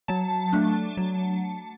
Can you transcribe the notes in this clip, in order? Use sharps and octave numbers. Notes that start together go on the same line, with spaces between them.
F#3 A5
A3 D4
F#3